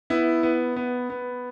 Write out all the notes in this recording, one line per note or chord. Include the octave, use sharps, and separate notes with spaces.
B3 E4
B3
B3
B3